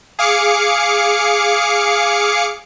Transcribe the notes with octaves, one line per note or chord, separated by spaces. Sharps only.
G#4 F5 D6 C#7